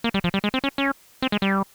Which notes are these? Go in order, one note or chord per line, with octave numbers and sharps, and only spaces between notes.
A#3
G3
F3
G3
G#3
C4
C#4
C#4
C4
G#3
G3